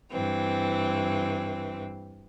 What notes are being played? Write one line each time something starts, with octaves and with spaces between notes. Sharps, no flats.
G2 E3 C4